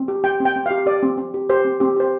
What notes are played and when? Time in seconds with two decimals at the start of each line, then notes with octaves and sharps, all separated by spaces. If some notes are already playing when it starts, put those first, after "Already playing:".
Already playing: C4
0.08 G4
0.24 G4 G5
0.40 C4
0.45 G5
0.56 C4
0.66 G4 F5
0.86 G4 D5
1.03 C4
1.17 C4
1.34 G4
1.49 G4 C5
1.65 C4
1.80 C4 G4
1.96 G4 C5